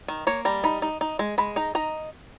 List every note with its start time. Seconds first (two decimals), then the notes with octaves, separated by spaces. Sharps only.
0.08 D#3
0.27 A#3 C#5
0.45 G3 A#5
0.64 D#4 B5
0.82 D#4
1.01 D#4
1.19 G#3
1.38 G#3 B5
1.56 D#4 A#5
1.75 D#4 A#5